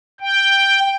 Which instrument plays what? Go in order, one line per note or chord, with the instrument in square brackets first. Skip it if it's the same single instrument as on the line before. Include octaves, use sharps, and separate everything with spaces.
[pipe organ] G5